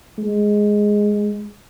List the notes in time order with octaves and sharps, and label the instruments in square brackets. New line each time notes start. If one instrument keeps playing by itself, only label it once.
[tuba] G#3